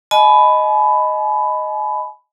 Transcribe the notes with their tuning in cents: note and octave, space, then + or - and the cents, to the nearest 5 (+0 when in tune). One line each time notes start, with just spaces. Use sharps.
D#5 +0 G#5 +40 B5 +10